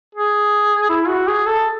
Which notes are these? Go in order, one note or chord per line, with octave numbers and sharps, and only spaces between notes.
G#4
E4
F#4
G#4
A4